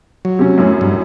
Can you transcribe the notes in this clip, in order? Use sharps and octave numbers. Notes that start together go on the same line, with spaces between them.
F#3
C3 C#4
F#2 A2 C#4
G2